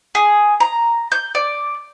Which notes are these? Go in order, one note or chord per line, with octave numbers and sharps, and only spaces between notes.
G#4
A#5
G6
D5